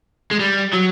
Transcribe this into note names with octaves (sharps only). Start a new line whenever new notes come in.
G#3
G3
F#3